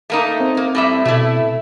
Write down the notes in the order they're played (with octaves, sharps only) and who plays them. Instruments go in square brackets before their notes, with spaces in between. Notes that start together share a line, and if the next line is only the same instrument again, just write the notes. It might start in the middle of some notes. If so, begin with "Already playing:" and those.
[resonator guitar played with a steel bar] A3 A#3 D#4
[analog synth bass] C4
[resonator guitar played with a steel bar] A#3
A2 G3 E5
[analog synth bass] B2 [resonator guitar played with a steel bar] A3 E4